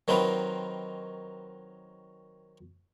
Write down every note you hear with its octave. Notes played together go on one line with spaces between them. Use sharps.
D#3 F#3 C4 D#4 F4 B4